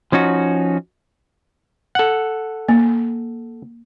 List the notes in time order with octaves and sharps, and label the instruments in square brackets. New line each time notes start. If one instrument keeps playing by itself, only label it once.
[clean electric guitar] F3 C#4 D#4 F#4
[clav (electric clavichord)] A4 F#5
[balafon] A#3